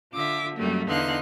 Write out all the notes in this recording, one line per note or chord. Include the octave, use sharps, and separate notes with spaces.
D3 F4 E5 D6
F#2 G3 A3 A#3
E2 D3 D#4 F5 C6 F#6